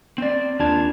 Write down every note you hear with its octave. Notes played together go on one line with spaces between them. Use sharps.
C4 D5
D#2 D4 F4 A5 G#6